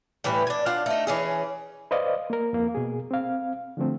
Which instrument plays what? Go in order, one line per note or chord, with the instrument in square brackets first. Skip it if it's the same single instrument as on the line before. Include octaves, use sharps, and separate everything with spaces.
[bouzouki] A2 E3 G3 B4
D4 G#5
D4 F4 F#5
A3 D#4
E3 C#4 G#4
[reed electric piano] B4 C5 D5 D#5 F5
A#3 A#4
F2 A#3
B2 G#4
C4 F5
D3 F3 A3 C4